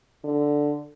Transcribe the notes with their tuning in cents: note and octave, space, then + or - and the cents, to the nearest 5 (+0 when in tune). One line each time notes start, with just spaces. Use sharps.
D3 +0